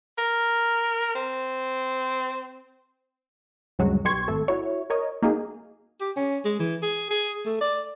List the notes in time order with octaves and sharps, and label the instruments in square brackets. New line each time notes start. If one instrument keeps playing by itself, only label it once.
[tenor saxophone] A#4
C4
[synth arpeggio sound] D2 G2 C#3 F#3 G#3 F#4
B1 G4 C6 C#6 G#6
G#1 A3 A4
E4 F#4 C#5
A#4 C#5 D#5
A#3 D#4 F#4 G#4
[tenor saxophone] G4
C#4
G#3
E3
G#4
G#4
A3
D5